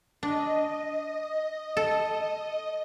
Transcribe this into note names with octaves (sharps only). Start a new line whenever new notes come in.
D4 D#5
A4